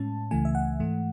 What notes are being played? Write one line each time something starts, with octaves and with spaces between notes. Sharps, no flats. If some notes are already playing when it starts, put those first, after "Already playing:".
Already playing: A2 G#3 C#4 A5
C#2 C#3 E3 A3 G#5
E5
F#5
G#2 E3 A3